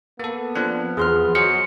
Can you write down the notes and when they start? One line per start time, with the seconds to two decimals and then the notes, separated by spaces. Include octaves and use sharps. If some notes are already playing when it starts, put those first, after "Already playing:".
0.19 A#3 B3 A4
0.55 F3 C4 D4 F#6
0.97 E2 F3 G#4 C6 F6
1.35 F#3 G#4 C5 D#5 F6 C#7